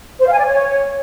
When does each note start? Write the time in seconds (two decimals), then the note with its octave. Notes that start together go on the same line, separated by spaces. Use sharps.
0.20 C5
0.26 F5
0.32 G#5
0.38 D5
0.44 C#5